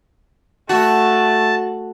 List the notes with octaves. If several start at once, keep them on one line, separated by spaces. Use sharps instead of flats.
A3 F#4 A5